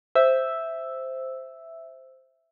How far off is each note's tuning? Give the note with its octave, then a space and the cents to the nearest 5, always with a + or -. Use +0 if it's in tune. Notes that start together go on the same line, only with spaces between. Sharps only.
C5 +0 E5 +0 E6 +0